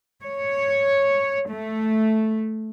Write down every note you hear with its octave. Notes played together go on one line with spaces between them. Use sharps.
C#5
A3